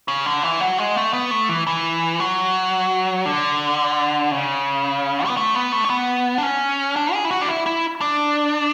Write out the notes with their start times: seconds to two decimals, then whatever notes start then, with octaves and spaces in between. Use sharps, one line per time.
0.08 C#3
0.26 D3
0.43 E3
0.60 F#3
0.78 G#3
0.96 A3
1.13 B3
1.31 A3
1.49 E3
1.67 E3
2.20 F#3
3.25 D3
4.31 C#3
5.27 B3
5.37 A3
5.55 B3
5.72 A3
5.85 C#4
5.90 B3
6.38 D4
6.43 C#4
6.96 D4
7.13 G#4
7.25 E4
7.31 F#4
7.41 D4
7.48 E4
7.66 E4
8.01 D4